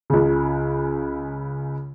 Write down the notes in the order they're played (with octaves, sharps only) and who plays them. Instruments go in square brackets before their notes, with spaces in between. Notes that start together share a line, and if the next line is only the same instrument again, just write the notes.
[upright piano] C#2 C#3